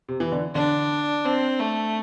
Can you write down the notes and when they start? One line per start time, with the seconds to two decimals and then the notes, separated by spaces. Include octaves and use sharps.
0.08 C3
0.20 E3
0.32 D3
0.55 D3 D4
1.25 C4
1.60 A3